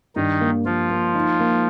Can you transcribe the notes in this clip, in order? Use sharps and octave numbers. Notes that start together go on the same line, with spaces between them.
G2 D#3 D#4
A#3
F3 A#3 F4
A#3
D#4
A#3